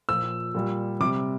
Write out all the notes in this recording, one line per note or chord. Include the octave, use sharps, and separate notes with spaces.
A#2 F3 E6
A#2 G3
C3 G3 D6